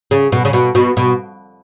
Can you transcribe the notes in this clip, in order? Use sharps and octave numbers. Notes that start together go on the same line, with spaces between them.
C#3
B2
C#3
B2
B2
B2